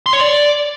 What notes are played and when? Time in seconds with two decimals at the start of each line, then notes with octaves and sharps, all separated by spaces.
0.06 C6
0.13 C#5
0.21 D5